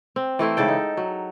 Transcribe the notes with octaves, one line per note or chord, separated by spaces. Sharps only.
C4
E3 A3 E4 C5
G#2 C#3 A4 G5
D#4
F#3